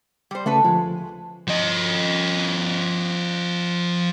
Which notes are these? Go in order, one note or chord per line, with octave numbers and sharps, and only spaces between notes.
G3 C5
C#3 A3 F#4 A4 B4
D2 F3 G#3
F3 D#5